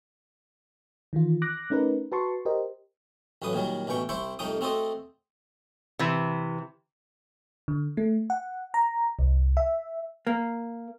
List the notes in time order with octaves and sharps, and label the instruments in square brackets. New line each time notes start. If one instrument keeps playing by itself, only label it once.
[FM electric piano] D#3 E3 F4
D6 F#6 A#6
A3 C#4 D#4 A#4 B4
F#4 B4 A5 C6 C#6
G4 A#4 C5 D#5
[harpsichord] A1 A2 F#3 B4 D#6
A#2 D#3 F#3 G3
A1 B2 E3 G5 C#6
C2 E4 C5 E5 G5 C#6
C2 F2 A3 D#4 G5 D#6
A3 C4 F#4 A4 C5 D#5
[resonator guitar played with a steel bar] C3 E3
[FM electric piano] D3
A3
F#5
A#5
C2
E5
[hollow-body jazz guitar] A#3